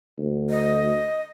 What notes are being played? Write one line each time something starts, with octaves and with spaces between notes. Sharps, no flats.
D2
D#5